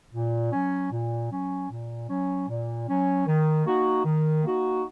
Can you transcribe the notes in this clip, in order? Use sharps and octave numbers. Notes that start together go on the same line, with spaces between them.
A#2
F#3 C#4
A#2
F#3 C#4
A#2
F#3 C#4
A#2
F#3 C#4
D#3
A#3 D#4 F#4
D#3
A#3 D#4 F#4